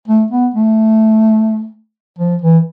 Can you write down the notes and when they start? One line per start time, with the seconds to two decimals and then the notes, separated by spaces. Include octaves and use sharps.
0.07 A3
0.30 B3
0.54 A3
2.18 F3
2.42 E3